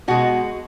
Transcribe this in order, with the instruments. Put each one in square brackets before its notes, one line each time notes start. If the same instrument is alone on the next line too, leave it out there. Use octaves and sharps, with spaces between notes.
[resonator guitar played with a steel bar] B2 G#3 F#4